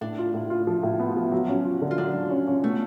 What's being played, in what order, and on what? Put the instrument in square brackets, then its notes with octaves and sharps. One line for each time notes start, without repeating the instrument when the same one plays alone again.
[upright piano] A2 [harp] D4
[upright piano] F4
A2
F4
F3
A2
B3
F3
F#3
C#4
F4
D3
[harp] F4
[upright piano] F#3 [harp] D4
[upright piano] F#3
C#4
C#4
[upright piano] B2 [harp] A3